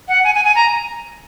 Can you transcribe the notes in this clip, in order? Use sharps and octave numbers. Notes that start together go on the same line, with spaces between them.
F#5
G#5
G#5
G#5
A#5